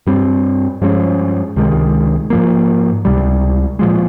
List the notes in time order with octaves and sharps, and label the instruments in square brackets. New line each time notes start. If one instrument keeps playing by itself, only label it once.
[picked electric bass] G2 G3 C4
G2 F3 G#3 C#4
C#2 C3 D#3 G#3
G#2 F3 A#3
C#2 C3 G3
A#2 F3 G#3